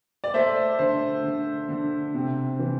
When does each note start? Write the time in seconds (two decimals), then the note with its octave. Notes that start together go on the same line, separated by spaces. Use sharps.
0.24 D5
0.34 A3 C5 E5
0.79 D3 C5
1.24 D3
1.69 D3
2.14 C3
2.59 E3